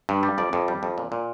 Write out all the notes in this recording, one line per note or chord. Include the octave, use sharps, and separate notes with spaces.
G2
G3
F2 D5
F2
G3
F2
A#2
A#2